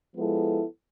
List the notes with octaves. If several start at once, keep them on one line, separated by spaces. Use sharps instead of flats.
F3 G#3 B3 E4 A4